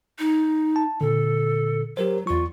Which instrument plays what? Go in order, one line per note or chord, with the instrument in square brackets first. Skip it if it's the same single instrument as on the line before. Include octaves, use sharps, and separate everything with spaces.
[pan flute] D#4
[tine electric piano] A5
[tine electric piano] A#2 D3 [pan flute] A4
[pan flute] F#3 [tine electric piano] G4 A#4 C5
[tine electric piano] E2 C#6 [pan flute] F4